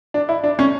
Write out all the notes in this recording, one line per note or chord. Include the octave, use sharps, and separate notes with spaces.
D4
E4
D4
C#4